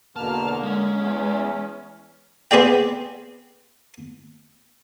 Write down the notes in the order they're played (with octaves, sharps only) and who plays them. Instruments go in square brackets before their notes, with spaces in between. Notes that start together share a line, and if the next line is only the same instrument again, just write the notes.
[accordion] E2 B2 F6 [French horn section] D3 A#3 [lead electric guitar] A5
[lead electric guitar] G#3 [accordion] C#4
[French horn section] E2
[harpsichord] B3 C4 G#4 D5 G5